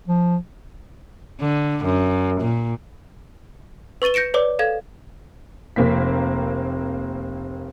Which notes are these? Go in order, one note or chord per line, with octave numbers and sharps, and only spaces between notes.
F3
D3
F#2
A#2
B4 C#6 A6 D#7 G7
G6 A#6 C#7 D7 E7
B4 C#5 D5 D6
A4 F5 G#6
F1 A#3 C4 B6